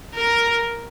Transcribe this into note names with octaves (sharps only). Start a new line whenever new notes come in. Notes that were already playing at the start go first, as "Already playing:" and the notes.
A#4